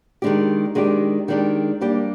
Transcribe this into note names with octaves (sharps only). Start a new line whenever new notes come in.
D#3 G#3 D4 G4
D#3 G#3 D4 G4
D#3 G#3 D4 G4
G3 A#3 D4 G4